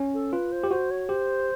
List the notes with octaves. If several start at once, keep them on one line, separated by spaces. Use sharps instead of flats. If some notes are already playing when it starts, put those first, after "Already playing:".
Already playing: C#4
A4
F4 B4
C5
G4
F#4 C5
C#5
G4 C5